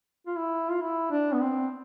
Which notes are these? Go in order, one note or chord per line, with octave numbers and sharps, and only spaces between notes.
F4
E4
F4
E4
D4
B3
C4